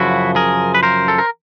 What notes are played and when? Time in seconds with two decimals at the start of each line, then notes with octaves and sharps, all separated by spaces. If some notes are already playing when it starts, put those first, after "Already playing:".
Already playing: F#2 C#3 F3 E4 F#4
0.36 G#4 A#4
0.75 B4
0.83 A#4 C5
1.08 A4
1.18 A#4